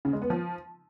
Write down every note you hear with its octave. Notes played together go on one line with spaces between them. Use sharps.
C#3
G#3
B3
F3